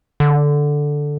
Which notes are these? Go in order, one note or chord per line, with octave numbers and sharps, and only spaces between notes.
D3